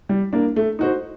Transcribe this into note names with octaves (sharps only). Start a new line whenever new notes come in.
G3
A#3 D4
A3
D#4 F#4 C5